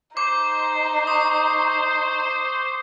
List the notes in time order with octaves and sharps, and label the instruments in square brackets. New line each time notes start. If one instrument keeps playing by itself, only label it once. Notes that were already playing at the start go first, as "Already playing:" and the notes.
[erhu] D#4 [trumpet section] C5 [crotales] D6
[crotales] C#6 D#6